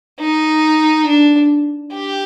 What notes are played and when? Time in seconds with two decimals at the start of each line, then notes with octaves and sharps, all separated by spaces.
0.20 D#4
1.07 D4
1.94 G4